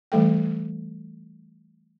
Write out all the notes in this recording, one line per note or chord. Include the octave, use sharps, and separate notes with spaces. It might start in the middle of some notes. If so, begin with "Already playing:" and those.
E3 G3 A3 A4 G5